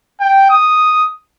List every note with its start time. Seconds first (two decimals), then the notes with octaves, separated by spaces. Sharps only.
0.20 G5
0.50 D#6